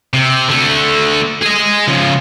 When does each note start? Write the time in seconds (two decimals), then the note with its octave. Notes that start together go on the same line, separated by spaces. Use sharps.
0.13 C3
0.49 D3 A3
1.42 G#4 D#5
1.88 C#3 F3